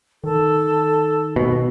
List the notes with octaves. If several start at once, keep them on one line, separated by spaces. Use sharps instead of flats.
D#3 A4
B2